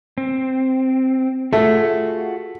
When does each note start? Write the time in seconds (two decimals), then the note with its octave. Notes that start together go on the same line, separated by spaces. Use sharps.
0.18 C4
1.53 A3 F4 F#4 G#4